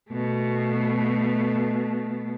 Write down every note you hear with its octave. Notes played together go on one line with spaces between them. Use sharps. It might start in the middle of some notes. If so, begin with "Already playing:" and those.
B2 A3